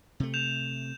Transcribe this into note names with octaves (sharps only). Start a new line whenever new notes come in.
C3 A3
G6 E7 F7